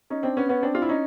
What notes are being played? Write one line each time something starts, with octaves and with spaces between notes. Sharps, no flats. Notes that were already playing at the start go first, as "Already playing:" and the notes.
C#4 D#4
C4 D4
B3 C#4
B3 C#4
C4 D4
F4
E4
C#4 D#4